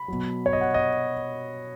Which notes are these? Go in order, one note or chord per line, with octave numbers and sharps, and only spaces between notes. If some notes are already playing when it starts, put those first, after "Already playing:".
Already playing: B5
B2 F#3
C#5
D#5
F#5
D#5